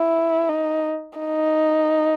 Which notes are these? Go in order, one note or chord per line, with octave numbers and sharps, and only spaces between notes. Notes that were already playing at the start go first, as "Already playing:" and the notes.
Already playing: E4
D#4
D#4